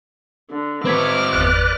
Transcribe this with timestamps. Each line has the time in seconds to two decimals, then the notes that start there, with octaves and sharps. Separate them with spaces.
0.50 D3
0.85 C4 F#4 B4 D6 F6 G#6 B6
1.33 G1 E2 B4 D5 F#6